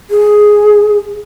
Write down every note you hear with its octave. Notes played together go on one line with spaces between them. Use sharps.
G#4